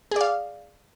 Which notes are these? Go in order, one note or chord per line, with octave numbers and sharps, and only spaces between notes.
G#4 D5 F5